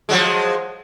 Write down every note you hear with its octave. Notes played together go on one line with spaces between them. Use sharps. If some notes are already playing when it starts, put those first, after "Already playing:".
F3 F#3 G#3